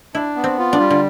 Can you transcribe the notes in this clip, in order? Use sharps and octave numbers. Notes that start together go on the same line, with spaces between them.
D4 E4
B3
C4
F4
D4
G3
D3